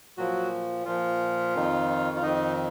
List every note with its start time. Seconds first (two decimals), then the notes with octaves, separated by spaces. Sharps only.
0.17 A#2 F3 F#3 F#4
0.85 A#2 F3 F4
1.54 F2 D#3
2.17 F4
2.22 F2 D#3 D#4